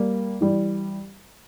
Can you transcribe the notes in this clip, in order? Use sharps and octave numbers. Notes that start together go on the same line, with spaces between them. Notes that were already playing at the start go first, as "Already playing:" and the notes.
Already playing: G3 A#3
E3 G3